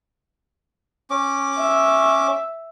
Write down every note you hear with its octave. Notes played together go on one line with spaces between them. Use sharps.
C#4 D6
E5